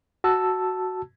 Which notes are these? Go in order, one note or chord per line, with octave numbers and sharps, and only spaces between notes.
F#4 A5 E6